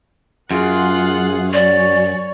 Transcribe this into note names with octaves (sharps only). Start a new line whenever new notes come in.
F#2 F4 G#4 F#5
C#5 D5